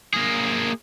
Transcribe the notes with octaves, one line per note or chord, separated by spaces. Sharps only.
A#3 G#4